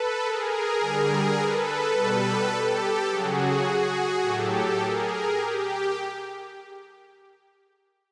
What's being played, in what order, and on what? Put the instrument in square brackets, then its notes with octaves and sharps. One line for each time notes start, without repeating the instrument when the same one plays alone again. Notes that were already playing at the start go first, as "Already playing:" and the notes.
Already playing: [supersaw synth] A4 B4
G#4 A#4
D3 G3
A4 B4
B2 G3
G4 A4
C#3 F#3 F#4 G#4
A2 F#3 G4 A4
G#4 A#4
G4